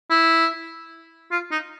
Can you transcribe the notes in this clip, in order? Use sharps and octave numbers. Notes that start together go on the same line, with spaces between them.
E4
F4
D#4